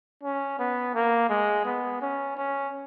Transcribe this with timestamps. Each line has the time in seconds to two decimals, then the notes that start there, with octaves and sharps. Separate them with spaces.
0.23 C#4
0.59 B3
0.95 A#3
1.29 G#3
1.66 B3
2.02 C#4
2.37 C#4